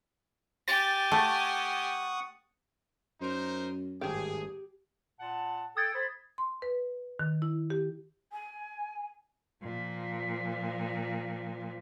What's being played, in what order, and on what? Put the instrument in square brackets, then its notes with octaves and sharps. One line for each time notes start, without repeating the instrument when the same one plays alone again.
[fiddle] G4 G#5 [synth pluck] A6
[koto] A3 [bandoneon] F#5 C#6 D#6
[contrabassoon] F#2 [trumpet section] D#4 A#4 C5
[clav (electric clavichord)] G#1 G2 A3 [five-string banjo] G4 [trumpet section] G#4
[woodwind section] A#2 F#5 A5
[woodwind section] A4 G5 [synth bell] D#6 G#6 A6
[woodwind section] C5 B5
[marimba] C6
B4
D#3
E4
G4
[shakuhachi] G#5
[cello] A#2 F3